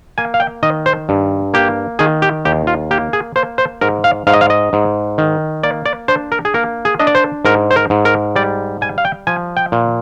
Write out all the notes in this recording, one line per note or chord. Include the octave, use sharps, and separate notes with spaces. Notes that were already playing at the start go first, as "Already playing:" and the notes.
A#3 G#5
F5
G5
D#3 D#5
C5
G2
A#3 G4
D#3 G#4
G4
D#2 G4
F4
A#3 G4
G#4
A#3 C5
C5
G#2 A#4
F5
G#2 F5
D#5
F5
D#5
G#2
D#3
A#3 D5
D5
D4 C5
A#4
G#4
A#3 A#4
G#4
D4 D#5
D5
C5
G#2 A#4
C5
A#4
G#2
A#4
G3 D5
G3 G#5
F5
G5
F3 G#5
G5
A#2